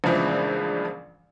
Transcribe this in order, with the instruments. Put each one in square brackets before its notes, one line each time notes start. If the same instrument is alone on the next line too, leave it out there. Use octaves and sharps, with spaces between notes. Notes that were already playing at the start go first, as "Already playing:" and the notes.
[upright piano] A#1 G2 C#3 E3 F3 G#3